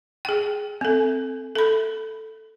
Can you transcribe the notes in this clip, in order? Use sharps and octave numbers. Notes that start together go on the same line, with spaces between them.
G#4 G5
C4 A4
A4 B5